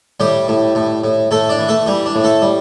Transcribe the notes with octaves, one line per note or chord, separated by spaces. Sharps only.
A2 G3 G4
A2
A2
A2
A2 A3 A4
D4 D5
E3
A3 A4
E3 G3 G4
D4
A2
A3 A4
G3